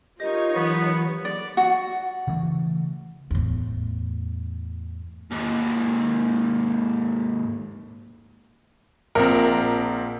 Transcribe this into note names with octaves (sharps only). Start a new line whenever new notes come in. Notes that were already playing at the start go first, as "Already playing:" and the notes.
D#4 F4 G4 A#4 C#5 D#5
E3 F#3 B3
D5
F#4
C#3 E3 A3
E2 A2
D#2 G#2
A#1 F3 C4 A#4